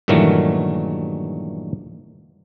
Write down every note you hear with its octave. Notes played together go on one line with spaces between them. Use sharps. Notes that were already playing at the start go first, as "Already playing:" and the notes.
G2 A#2 D#3 E3 F#3 A3